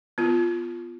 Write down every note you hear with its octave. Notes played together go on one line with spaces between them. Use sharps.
B3 F4